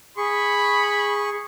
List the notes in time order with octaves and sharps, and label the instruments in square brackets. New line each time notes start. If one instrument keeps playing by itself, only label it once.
[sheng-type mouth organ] G#4 C#6 [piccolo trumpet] B5